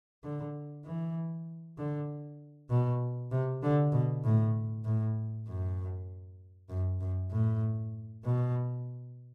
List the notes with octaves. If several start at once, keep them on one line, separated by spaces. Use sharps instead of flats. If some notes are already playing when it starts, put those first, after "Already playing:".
D3
E3
D3
B2
C3
D3
B2
A2
A2
F#2
F#2
F#2
A2
B2